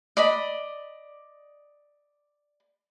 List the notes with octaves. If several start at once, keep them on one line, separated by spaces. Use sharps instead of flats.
D5 D#5 B5